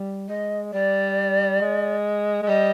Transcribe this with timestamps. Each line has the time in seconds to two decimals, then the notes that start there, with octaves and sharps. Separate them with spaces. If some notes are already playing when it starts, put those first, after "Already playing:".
Already playing: G3
0.29 G#3 D#5
0.73 G3 D5
1.60 G#3
2.42 G#3
2.48 G3 D#5